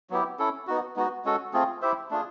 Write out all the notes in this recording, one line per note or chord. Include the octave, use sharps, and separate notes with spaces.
F#3 B3 E4 G4
C#4 E4 A4
B3 D#4 F#4
G#3 B3 D#4 F#4
G#3 C#4 F#4 A4
A3 C4 F4 G#4
E4 G4 C5 E5
A3 D4 F4 G#4